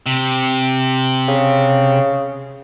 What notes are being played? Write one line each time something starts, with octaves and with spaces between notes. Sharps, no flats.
C3
C#3